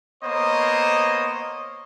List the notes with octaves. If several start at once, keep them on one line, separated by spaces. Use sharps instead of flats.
A#3 B3 C5 C#5 D#5